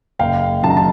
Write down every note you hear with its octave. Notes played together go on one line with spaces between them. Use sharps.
F#1 F5 G5
F#2 D#3 F#3 A5
A#5
A5